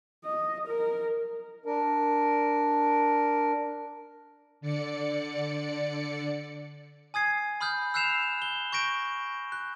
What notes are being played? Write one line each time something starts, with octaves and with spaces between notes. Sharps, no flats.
D#5
A#4
D4 A#4
D3 D5 C#7
G#5 D#6 G#6 C7
B5 D#6 F6 G6
E6 F#6 G6 C7 E7 F7
G7
C#6 G6 A#6 D7
F#6